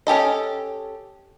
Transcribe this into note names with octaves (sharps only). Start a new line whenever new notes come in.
C#4 G4 A4 D#5